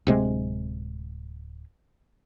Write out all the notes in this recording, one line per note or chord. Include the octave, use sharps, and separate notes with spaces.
D1 C3 G#3